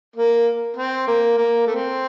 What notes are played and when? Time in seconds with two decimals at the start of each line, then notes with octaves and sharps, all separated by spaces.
0.16 A#3
0.77 C4
1.07 A#3
1.37 A#3
1.67 A3 C4